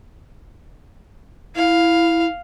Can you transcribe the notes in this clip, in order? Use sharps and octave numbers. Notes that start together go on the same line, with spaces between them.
E4 F5